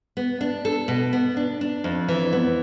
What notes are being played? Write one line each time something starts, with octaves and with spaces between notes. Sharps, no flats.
B3
D4
A4
B2
B3
D4
D4
F2
E3
B3